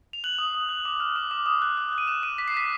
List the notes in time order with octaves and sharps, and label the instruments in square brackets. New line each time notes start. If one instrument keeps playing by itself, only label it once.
[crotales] F7
F#6 F#7
D#6
D#6
F#6
D6
F6
D6
D6
D#6
F#6
F#6
F#6 D#7
F#6 E7
D6 D#7
D6 B6
C7
F#6 B6